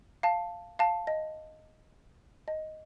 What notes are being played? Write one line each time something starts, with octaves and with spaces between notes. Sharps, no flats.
F5 A5
F5 A5
D#5
D#5